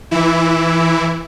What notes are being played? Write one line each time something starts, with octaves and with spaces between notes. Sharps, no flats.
E3 E4